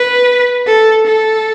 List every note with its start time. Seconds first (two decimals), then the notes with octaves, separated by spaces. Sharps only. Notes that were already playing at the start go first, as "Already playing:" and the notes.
Already playing: B4
0.67 A4
1.07 A4